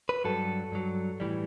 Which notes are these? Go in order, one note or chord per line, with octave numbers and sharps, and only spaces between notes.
B4
G2 F#3 A4
G2 F#3
A2 E3 G3